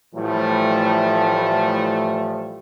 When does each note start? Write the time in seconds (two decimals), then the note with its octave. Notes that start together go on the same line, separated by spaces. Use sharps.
0.15 A2 E3 F3 G3 A3